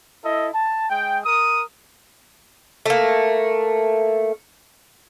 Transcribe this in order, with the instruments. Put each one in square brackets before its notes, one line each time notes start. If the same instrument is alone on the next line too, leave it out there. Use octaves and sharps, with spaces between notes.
[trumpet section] E4 A4 D#5
A5
G#3 G5
A#4 D#6
[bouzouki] A3 A#3